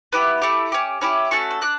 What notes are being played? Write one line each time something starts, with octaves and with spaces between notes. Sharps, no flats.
B3 E4 G4
A3 E4 G4
C#4 G4
C#4 E4 G4
A3 C#4 F#4 A4 C#6
E6
D4 F#4 F#6